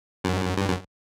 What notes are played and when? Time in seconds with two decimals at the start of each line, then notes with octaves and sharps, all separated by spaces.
0.24 F#2
0.57 G2
0.68 F#2